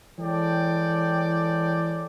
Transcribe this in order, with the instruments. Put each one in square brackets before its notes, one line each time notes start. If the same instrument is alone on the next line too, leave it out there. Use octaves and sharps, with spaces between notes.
[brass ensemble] E3 G#3 A4 C#5 D5 G5